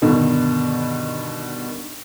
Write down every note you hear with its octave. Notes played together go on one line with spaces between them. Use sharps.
G2 B2 D3 D#3